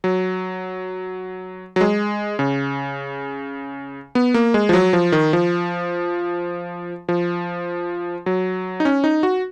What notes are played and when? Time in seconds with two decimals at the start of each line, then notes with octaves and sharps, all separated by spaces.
0.04 F#3
1.76 F#3
1.81 G#3
2.39 C#3
4.15 B3
4.34 A#3
4.54 G#3
4.69 F3
4.73 F#3
4.93 F3
5.12 D#3
5.33 F3
7.09 F3
8.26 F#3
8.80 D#4
8.85 C#4
9.04 D#4
9.23 F#4